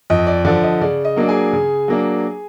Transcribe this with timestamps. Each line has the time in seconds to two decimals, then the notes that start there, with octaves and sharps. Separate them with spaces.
0.10 F2 D#5
0.27 D5
0.45 D3 F3 D5
0.63 D#5
0.81 C#3 D5
1.05 D#5
1.16 F#3 A#3 D4
1.28 G#4 G#5
1.53 C#3
1.88 F#3 A#3 D4